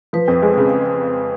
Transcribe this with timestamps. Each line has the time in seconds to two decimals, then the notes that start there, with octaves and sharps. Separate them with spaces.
0.13 F3 B4
0.28 F2
0.42 G#3
0.57 C#3